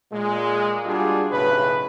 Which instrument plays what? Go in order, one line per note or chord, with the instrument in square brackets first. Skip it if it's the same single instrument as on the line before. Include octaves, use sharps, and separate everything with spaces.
[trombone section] A#2 G#3
G3 D4 F4 F#4 G#4
B1 A2 C#3 B4